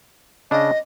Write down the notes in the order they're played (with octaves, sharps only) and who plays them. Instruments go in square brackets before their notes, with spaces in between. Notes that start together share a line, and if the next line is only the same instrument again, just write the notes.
[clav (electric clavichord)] C#3 D4 [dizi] D#5